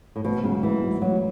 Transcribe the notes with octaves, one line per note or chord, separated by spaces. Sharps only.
A2
A1 B2
G#2 C#3 F#3
A1 E3
G#2 F#3
A1 F#3